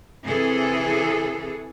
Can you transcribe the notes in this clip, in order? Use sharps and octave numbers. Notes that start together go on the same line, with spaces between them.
C3 E3 G#4 A4